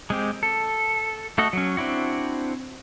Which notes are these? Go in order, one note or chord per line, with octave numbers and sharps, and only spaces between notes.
G#3 C4 G4
A4
A3 F#4 A4 D#5
F#3 C#4
C4 D4 E4 F#4